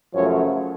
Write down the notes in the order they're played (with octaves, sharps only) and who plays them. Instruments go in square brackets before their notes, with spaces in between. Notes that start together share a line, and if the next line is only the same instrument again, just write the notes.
[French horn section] F#2 C#3 F3 A3 C#5